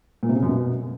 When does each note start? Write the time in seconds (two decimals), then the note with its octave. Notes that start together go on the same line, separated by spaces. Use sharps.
0.23 A#2
0.29 C3
0.36 C#3
0.42 F#2
0.49 B2